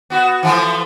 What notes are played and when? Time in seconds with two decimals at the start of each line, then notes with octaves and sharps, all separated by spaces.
0.10 B3 F#4
0.43 E3 F3 A3